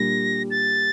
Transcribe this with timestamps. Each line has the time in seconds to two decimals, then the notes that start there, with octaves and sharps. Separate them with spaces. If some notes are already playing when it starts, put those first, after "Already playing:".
Already playing: A#2 G3 D4 G4 A#6
0.51 A6